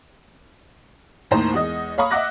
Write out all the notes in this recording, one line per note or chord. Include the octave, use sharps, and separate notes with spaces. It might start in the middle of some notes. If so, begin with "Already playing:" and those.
D#2 A2 D#4 C5 A#5
E2 G#3 D#5 D#6
C#5 F5 A#5 B5 C#6 D#6
D#5 E5 F#5 D6 F#6 A#6